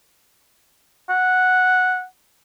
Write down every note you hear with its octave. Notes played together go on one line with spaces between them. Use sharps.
F#5